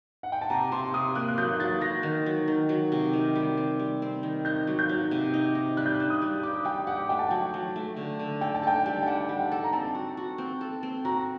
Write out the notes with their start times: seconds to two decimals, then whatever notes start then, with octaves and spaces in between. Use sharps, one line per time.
0.23 F#5
0.32 G5
0.41 A5
0.50 C3 A#5
0.72 C3 C6
0.94 C3 D#6
1.15 A#3 F#6
1.28 F#6
1.38 F#3 G6
1.60 F#3 A6
1.81 F#3 A#6
2.03 D#3
2.26 F#3
2.48 D#3
2.69 F#3
2.92 C3
3.13 D#3
3.35 G3
3.57 C4
3.79 G3
4.02 C4
4.23 D#3
4.45 D#4 G6
4.67 F#3
4.79 G6
4.89 F#3
5.11 C3
5.34 D#4
5.55 D#4
5.77 G3 F#6
5.86 G6
5.95 F#6
6.00 D4
6.10 D#6
6.22 G3
6.43 G4 D6
6.65 G3 G5
6.87 G4 F#5
7.09 A3 G5
7.19 A5
7.29 F#3 G5
7.54 F#3
7.76 A3
7.97 D3
8.19 D3
8.41 A4 G5
8.54 A5
8.63 A4 G5
8.86 G3
9.02 G5
9.07 D4 F#5
9.29 G3
9.40 G5
9.52 A4
9.64 A#5
9.73 C4 A5
9.95 F#4
10.17 F#4
10.38 C4
10.61 A4
10.83 C4
11.05 F#4 A#5